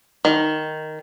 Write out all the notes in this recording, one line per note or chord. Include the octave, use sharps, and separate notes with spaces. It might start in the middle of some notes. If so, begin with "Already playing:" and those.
D#3